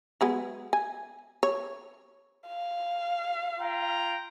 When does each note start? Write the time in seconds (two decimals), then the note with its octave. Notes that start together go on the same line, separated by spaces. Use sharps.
0.21 F#3 G#3 B3
0.73 G#5
1.43 C#5
2.47 F5
3.60 F4 G5 A#5